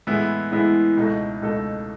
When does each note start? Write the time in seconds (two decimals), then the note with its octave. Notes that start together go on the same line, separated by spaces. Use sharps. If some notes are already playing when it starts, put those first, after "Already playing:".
0.07 A2 E3 G#3 B3 E4
0.52 A2 E3 G#3 B3 E4
0.97 C#2 B2 A3 D#4 A4
1.42 C#2 B2 A3 D#4 A4